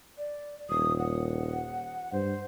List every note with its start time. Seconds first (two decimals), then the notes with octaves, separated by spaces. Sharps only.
0.18 D5
0.70 D#1 D#6
0.99 F#5
2.13 G2 C5